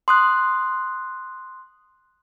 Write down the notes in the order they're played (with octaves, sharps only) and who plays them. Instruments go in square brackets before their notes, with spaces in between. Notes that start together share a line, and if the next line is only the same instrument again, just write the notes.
[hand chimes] C6 D#6 F#6